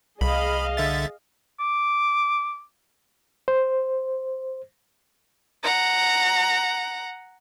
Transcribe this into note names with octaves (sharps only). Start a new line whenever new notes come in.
C2 G#4 D#5 F5 B5
D3 E5 A6
D6
C5
F#5 A#5